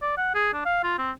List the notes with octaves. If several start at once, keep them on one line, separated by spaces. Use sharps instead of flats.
D5
F#5
G#4
D4
F5
F4
C4